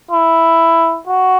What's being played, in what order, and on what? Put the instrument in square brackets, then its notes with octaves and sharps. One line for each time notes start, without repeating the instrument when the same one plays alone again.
[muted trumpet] E4
F#4